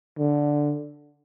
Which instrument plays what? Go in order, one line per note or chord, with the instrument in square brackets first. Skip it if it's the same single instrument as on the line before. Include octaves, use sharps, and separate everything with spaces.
[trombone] D3